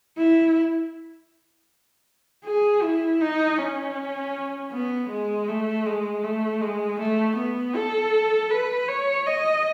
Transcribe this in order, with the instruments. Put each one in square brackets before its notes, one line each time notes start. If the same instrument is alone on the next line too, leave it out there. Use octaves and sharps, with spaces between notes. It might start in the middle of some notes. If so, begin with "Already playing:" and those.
[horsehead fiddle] E4
G#4
E4
D#4
C#4
B3
G#3
A3
G#3
A3
G#3
A3
B3
A4
B4
C#5
D#5